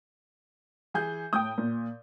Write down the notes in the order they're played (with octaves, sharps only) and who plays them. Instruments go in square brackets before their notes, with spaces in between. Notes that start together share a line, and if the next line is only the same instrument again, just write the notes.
[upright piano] E3 G#4 G6
[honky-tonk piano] A2 G5 [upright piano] D#6 G6
[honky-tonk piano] A#2